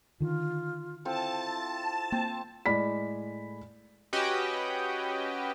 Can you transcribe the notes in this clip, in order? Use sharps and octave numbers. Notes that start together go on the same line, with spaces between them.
D3 D#3 F4
C4 E4 F4 A4 A5
A#3 C4
A2 G#3 D5 B5 B6
C#4 F#4 G4 B4 D#5 G5